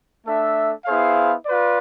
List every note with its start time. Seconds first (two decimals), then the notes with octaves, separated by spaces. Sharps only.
0.25 A3 D4 A4 E5
0.86 B3 E4 G#4 C5 F5
1.45 F4 B4 D5